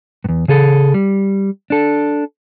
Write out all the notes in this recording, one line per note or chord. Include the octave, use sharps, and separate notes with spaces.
E2 G2
C#3 G#4 A4
G3
D4 A4